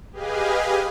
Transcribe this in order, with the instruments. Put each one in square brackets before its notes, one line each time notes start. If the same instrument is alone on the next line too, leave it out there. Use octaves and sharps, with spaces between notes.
[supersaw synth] G4 G#4 B4 D#5 F5 G#5